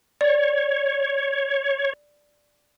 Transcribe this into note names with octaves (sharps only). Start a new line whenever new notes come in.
C#5 D5